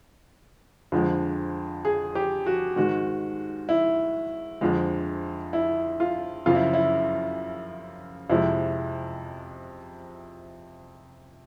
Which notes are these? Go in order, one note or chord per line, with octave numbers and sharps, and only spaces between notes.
F2 D3 F3 G#3
G#4
G4
F#4
G#2 D#3 G#3 F#4
E4
F2 D3 F3 G#3
E4
F4
F#2 C#3 F3 F4
E4
E4
F2 C3 F3 G#3 E4